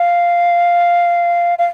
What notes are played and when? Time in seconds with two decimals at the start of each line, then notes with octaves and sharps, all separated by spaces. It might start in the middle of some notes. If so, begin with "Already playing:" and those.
Already playing: F5
1.59 F5